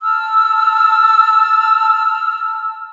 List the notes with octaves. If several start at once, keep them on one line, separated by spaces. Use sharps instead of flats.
A5 E6 F6